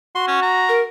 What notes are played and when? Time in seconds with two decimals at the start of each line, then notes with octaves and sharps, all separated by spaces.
0.15 F#4 C6
0.28 C#4
0.42 A#5
0.69 A#4